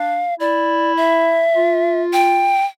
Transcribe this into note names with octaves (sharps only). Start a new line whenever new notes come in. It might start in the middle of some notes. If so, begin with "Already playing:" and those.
Already playing: D4 F5
E4 D5
E5
F4
G5